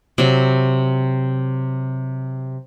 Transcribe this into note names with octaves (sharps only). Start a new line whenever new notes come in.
C3 F#3